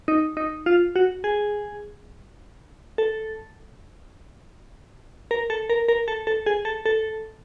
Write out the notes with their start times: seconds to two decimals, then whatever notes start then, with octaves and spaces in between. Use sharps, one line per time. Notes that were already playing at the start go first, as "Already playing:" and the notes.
0.08 D#4
0.37 D#4
0.66 F4
0.96 F#4
1.24 G#4
2.98 A4
5.31 A#4
5.50 A4
5.70 A#4
5.88 A#4
6.08 A4
6.27 A4
6.46 G#4
6.65 A4
6.86 A4